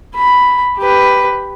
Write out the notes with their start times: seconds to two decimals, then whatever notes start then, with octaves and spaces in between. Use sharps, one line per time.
0.15 B5
0.78 G4 B4